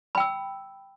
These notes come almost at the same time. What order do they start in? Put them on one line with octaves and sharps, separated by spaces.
B5 G5 E6